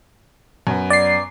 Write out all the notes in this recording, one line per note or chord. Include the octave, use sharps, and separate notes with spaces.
F#2 B3
D5 C7